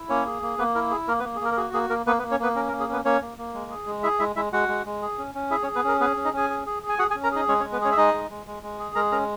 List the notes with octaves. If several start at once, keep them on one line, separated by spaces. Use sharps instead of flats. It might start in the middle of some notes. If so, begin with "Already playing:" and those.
Already playing: E4
A#3 C#4 C#5
G#4
A#3
A#3 B3 B4
E4 A#4
G#4
A#3 A#4
B3 B4
A#3
G#4
A#3 A#4
A#4
F#4 G#4
A#3 G#4
A#3 A#4
A#3 B3 B4
B3 B4
A#3
C#4 C#5
A#3 B3 B4
C#4 A#4
A#4
A#3
G#4
B3 C#4 B4
A#3 C#4 C#5
A#3
A#3
G#3
G#4
G#3
E4 G#4 E5
G#3 E4 E5
G#3 E4 E5
G#3 F#4 F#5
G#3
G#3
G#4
C#4
C#4
E4 G#4 E5
C#4 C#5
G#4
B3 B4
C#4 A#4
B3 G#4 B4
C#4
D#4 D#5
C#4 G#4 G#5
G#4
G#4
G#4
G#5
F#4 G#4 F#5
G#4 G#5
C#4
A#4 A#5
D#4 G#4 D#5
G#3 C#4 C#5
C#4 C#5
G#3
B3 B4
C#4 G#4 C#5
E5
G#3 D#4 D#5
G#3
G#3
G#3
G#3
G#4
G#3 A#4 A#5
C#4 A#4 A#5